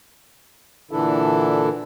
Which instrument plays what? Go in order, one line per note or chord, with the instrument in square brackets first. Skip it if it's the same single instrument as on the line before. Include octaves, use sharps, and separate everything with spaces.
[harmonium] A#2 D3 E3 D4 E4 A4